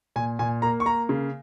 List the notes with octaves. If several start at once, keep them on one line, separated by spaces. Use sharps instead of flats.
A#2 G#5
A#2 G#5
A#3 A#5
C#6
A#3 A#5
C#3